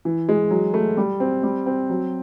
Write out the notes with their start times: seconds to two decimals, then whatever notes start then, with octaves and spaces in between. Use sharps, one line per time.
0.05 E3
0.29 G#3
0.51 F#3
0.74 A3
0.97 G3
1.20 C4
1.43 G3
1.66 C4
1.90 F#3